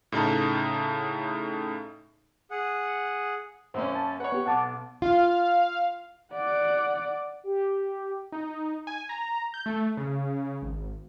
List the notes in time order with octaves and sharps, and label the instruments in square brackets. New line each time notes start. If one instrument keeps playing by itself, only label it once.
[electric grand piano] A2 C#3 D#4 A4
[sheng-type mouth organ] G#4 F#5
[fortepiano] F#2 A#3 C#4 [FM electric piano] C5
[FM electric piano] A5
[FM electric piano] B4 [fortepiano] C#5 F#5
[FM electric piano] B3 G4
[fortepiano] B1 [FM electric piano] F#5 A5 D6
[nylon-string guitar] F4 [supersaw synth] F5
[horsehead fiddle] D5 F#5
[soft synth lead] G4
[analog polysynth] D#4
G#5
A#5
G6
A3
C#3
G#1